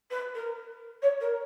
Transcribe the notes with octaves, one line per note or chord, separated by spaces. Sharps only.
B4
A#4
C#5
A#4